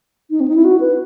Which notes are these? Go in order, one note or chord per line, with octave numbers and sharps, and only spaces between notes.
D#4
C4
D#4
E4
F#4
B4